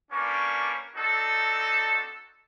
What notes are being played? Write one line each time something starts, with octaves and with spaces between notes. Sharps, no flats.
G3 A#3 C#4 D4 B4 C#6
C4 D4 D#4 F#4 A4